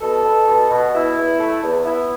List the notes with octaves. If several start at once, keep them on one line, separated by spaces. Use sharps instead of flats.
B2 A4
B2
B2
B2
B2 E4
E2
A3
E2
B3 E4